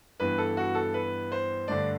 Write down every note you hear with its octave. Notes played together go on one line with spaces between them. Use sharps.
G2 E3 B3 B4
A4
F#4
A4
B4
C5
G2 D3 A3 D4 D5